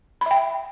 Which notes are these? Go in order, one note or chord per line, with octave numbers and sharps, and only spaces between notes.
E5 G5 B5